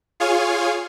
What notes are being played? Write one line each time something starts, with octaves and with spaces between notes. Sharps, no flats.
F4 G#4 C#5 F5 G#5